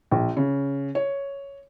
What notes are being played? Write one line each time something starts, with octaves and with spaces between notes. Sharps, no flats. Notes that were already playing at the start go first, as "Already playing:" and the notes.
A#1
C#3
C#5